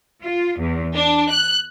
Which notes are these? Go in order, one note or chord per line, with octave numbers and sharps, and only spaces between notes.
F4
E2
D4
F#6